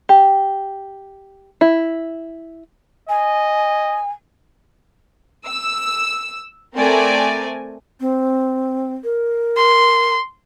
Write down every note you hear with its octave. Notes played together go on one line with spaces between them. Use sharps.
G4
E4
D#5 G#5
E6
A3 C4 A#4 D5 G#5
C4
A#4
C6